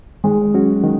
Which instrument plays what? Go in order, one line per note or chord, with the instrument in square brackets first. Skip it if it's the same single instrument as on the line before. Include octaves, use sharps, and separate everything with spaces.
[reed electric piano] D#3 [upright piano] G#3
[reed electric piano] F#3 C#4 F#4
D#3